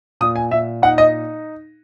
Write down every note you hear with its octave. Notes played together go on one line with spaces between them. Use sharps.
A#2 D#6
G#5
A#2 E5
D#4 F#5
D#5